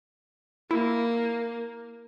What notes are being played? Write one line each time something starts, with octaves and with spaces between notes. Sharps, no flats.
A#3 E4